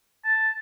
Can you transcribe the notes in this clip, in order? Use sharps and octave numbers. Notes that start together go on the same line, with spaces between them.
A5